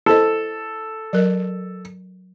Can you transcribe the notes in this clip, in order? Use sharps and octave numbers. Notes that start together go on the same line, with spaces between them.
E4 A4 C5 D#5
F#3 A#4 D#5